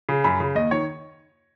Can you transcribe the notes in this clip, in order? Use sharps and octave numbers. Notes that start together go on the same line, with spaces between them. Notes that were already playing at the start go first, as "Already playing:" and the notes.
C#3
F#2 B5
C#3
D#2 D#5
D#3 C#5